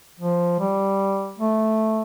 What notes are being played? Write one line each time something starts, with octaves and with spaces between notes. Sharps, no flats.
F3
G3
A3